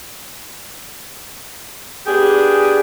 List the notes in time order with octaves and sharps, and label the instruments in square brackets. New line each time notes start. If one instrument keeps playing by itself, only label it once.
[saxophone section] B3 D4 G4 G#4